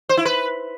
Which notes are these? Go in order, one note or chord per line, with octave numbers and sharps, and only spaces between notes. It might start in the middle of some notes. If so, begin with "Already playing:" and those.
C5
E4
B4